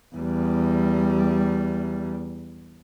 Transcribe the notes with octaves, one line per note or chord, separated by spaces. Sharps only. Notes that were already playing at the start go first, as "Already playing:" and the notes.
E2 G3